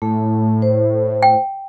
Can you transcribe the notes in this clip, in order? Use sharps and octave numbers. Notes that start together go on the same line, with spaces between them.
A2 A3
C5
G5